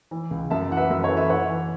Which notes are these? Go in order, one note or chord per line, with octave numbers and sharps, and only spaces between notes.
E3
C#2
F#2 E5 A5
E3 F#5
B4 E5
F#2 B4 E5
A4 C#5
E3
B4 E5
E3 C#5 F#5
E3